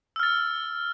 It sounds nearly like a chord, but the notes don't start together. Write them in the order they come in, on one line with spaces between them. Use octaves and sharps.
E6 F6 A6